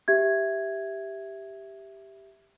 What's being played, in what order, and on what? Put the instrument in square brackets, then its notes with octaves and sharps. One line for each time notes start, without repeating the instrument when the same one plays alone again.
[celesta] G4 E5 G#6